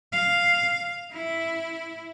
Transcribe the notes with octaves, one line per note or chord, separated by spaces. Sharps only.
F5
E4